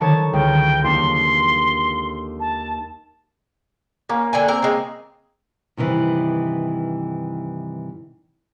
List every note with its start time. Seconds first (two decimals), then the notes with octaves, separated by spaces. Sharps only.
0.01 D3 D#3 C#5 A5
0.33 C#2 G5
0.84 D#2 D4 C6
2.40 A5
4.09 A#3 C#4
4.33 D3 G5 G#5
4.48 C4 A#4
4.62 C#3 G#3
5.77 G2 C3 D#3 E3